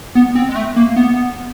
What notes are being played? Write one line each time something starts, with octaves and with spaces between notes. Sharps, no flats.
B3
C4
G#3
A3
A#3
B3